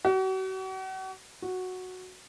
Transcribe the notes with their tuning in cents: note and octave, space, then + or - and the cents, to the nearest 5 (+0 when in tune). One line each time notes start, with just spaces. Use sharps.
F#4 +40
F#4 -5